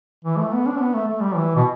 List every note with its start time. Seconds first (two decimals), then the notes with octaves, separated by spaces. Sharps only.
0.25 E3
0.38 A3
0.53 B3
0.67 D4
0.79 B3
0.94 A3
1.08 A3
1.21 G3
1.35 E3
1.56 B2